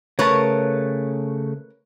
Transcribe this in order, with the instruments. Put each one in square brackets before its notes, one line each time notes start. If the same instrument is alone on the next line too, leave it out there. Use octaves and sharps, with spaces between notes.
[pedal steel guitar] C#3 A3 A5 [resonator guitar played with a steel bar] A#4 B4 C#5